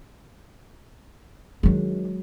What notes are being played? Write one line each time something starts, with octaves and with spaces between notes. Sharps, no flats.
D#3 F#3 G#3 D4